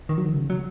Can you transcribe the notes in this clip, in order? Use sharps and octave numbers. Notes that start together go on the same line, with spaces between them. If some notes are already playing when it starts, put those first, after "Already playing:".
D#3
F#3
D#3
C#3
F#3